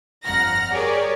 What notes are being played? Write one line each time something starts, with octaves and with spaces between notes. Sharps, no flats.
G1 F2 F#5 A#5 F6 A#6
G4 G#4 A#4 C#5 D5